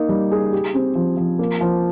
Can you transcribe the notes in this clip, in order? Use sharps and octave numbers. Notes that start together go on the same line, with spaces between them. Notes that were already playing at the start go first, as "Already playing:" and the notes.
Already playing: A#3 D#4
G3
G#4
G4
C4
F3
F3
A#3
F3